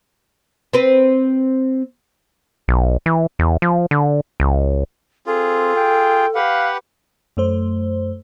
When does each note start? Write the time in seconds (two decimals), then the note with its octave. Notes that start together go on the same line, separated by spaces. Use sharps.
0.73 C4 B4
2.68 B1
3.06 E3
3.39 E2
3.62 F3
3.91 D3
4.40 C#2
5.27 C4 F4 G#4 A4
5.76 G5
6.35 G4 B4 F5 F#5
7.37 F#2 A3 C5